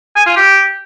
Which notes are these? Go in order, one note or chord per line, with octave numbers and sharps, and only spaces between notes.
G#5
F4
G4